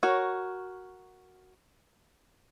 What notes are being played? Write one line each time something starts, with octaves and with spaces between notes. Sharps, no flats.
F#4 A#4 C#5